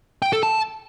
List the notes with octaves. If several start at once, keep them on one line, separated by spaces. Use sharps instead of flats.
G5
A4
A5